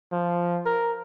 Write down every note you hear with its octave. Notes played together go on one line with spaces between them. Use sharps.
F3
A#4